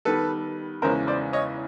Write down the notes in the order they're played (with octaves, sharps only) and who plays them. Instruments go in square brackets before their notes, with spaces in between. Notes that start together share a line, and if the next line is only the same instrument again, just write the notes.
[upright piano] D#3 G3 B3 [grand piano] A4 B4
[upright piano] E2 C#3 E3 G#3 C#4 [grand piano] A#4 C5
[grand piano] C5 D5
C#5 D#5